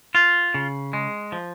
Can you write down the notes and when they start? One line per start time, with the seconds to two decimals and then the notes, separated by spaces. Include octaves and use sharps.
0.15 F4
0.54 C#3
0.93 G#3
1.32 F3